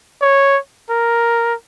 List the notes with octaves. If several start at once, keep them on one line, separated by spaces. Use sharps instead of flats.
C#5
A#4